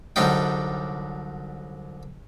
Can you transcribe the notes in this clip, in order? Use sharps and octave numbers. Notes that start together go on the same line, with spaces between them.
C2 D3 F#3 G3 D#4 G5